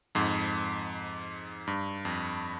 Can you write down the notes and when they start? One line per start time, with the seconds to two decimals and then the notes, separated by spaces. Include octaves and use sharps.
0.15 F2 G#2
1.67 G2
2.05 F2